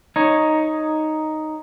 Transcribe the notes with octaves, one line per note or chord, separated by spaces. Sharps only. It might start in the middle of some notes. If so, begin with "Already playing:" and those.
D#4 C#5